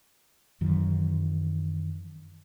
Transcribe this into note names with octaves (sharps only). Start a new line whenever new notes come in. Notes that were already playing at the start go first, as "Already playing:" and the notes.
F#2 D#3 E3 F#3